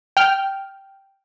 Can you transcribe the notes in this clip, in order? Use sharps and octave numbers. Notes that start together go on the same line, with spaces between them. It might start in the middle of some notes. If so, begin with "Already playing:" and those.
G5 F6